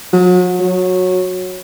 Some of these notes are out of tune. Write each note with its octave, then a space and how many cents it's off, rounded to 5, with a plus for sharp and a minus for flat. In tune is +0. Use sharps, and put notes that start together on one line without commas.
F#3 -35
F#3 -15